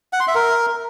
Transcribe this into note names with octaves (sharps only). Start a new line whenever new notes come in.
F#5
C6
E5
A#4